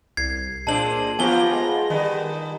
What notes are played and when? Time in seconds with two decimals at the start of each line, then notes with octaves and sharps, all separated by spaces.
0.17 C2 G#6 C7
0.67 A#2 G#3 C4 D4 A5 F#7
1.19 F3 A#3 B3 F4 G4 G#5 A#6 G7
1.51 G#3
1.90 D#3 G3 B3 D#4